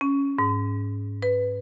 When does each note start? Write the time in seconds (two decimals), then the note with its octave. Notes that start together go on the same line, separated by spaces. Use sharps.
0.01 C#4
0.39 G#2
1.22 B4